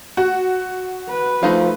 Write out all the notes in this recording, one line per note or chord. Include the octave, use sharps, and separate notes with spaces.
F#4
B4
F3 A3 D#4 F5